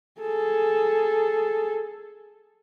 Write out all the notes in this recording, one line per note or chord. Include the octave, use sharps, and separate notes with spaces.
G#4 A4